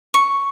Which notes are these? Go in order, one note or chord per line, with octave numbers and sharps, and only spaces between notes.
C#6